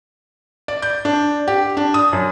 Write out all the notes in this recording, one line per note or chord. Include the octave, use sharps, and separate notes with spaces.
D5
G6
D4
G4
D4
D#6
F#2